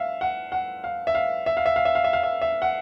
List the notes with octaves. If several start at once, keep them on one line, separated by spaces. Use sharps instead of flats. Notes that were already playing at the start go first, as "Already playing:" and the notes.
Already playing: E5 F5
F#5
F#5
F5
E5
F5
E5
F5
E5
F5
E5
F5
E5
F5
E5
E5
F#5